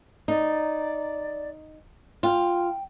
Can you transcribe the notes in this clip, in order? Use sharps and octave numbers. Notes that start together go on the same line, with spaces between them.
D#4 D5
F4 G5